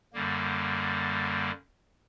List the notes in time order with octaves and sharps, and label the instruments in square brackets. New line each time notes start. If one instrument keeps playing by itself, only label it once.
[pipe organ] F#2 D3 G3 A#3